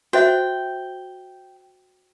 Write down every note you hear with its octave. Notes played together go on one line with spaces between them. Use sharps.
F#4 C5 E5 G5